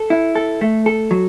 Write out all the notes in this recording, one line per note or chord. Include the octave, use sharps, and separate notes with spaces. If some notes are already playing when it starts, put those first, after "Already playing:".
Already playing: A4
E4
A4
A3
A4
F#3